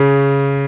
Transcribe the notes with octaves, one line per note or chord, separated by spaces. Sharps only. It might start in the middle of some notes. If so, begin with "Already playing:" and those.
Already playing: C#3